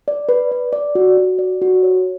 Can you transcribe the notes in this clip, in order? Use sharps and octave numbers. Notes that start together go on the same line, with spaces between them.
D5
B4
D5
D5
F#4
F#4
D5
F#4
C#5